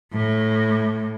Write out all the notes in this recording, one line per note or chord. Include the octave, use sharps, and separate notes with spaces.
A2